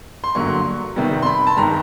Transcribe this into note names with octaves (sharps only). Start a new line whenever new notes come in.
C6
G2 D3 F#3 A#3 C#6
C3 D#3 G3 B3
C6
B5
A5
G2 D#3 G3 A#5